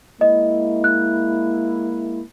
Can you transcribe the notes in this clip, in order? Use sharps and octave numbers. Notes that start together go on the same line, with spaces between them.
G#3 A#3 E4 D#5
F#6